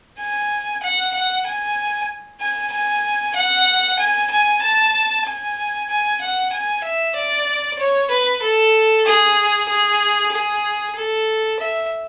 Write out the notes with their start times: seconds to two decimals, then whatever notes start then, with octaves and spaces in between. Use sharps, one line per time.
0.19 G#5
0.82 F#5
1.14 F#5
1.46 G#5
2.41 G#5
2.72 G#5
3.35 F#5
3.99 G#5
4.31 G#5
4.62 A5
5.25 G#5
5.89 G#5
6.21 F#5
6.52 G#5
6.84 E5
7.16 D5
7.79 C#5
8.10 B4
8.42 A4
9.06 G#4
9.68 G#4
10.32 G#4
10.96 A4
11.59 E5